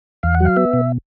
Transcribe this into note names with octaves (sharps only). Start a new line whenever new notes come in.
E2 F5
F#5
F#3 F5
B3 E5
B2